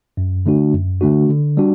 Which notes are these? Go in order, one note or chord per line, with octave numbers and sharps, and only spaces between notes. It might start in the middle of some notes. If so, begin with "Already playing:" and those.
F#2
D3 A3 D4 F#4
F#2
D3 A3 D4 F#4
D3
G3 D4 F#4